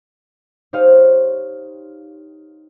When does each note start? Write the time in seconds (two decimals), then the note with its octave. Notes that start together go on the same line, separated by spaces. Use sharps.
0.73 D#4 G4 C5 C#5 D#5 F5